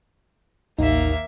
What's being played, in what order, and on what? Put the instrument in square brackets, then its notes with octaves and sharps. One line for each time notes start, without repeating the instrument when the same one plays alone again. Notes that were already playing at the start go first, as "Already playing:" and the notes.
[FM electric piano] A1 D#4 [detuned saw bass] D#2 [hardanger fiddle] A#3 E5